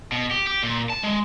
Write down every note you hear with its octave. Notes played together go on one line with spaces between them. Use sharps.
B2
G4
G4
A#2
A5
G#3